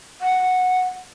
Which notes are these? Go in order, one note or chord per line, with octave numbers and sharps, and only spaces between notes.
F#5